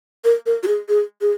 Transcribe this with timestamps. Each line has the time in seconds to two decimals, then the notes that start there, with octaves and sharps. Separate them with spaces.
0.24 A#4
0.46 A#4
0.63 F#4
0.68 G#4
0.89 G#4
1.21 G#4